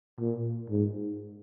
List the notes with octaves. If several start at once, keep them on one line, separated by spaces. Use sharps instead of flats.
A#2
G#2